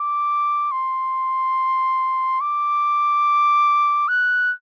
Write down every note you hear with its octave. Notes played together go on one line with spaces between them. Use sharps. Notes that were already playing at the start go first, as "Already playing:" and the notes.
Already playing: D6
C6
D6
F#6